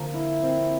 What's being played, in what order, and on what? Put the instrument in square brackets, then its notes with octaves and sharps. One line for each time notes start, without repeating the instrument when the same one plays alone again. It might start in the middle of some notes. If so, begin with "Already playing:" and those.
Already playing: [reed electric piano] D3 [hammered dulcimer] F3 A#3
[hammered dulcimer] E4
C4